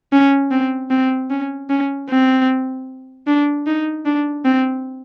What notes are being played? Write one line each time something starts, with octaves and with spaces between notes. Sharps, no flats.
C#4
C4
C4
C#4
C#4
C4
D4
D#4
D4
C4